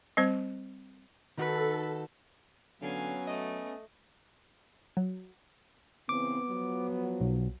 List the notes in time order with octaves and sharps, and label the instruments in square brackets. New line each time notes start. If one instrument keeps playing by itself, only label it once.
[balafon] G3 C4 C5
[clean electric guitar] D#3 D#4 F#4 [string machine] A4 [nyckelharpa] B4
[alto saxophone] D3 [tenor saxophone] F#3 [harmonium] B3 C#4 [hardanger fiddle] F5 G#5
[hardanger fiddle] A3 [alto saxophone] D#5
[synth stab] F#3
[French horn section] C#3 E3 C4 [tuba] B3 [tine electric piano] D6
[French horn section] F3 F#3
[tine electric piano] B1